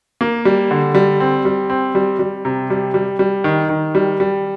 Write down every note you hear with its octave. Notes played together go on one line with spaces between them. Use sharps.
A#3
G3
D3
G3
C4
G3
C4
G3
G3
C3
G3
G3
G3
D#3
D#3
G3
G3